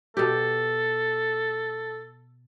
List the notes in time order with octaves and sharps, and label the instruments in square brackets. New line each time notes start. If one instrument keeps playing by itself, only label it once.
[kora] B2 G4 [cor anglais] A4